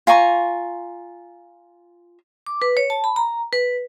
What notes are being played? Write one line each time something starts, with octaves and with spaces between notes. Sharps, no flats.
F4 G#5 A#5 C#6
D6
B4
C#5
A5
B5
A#5
B4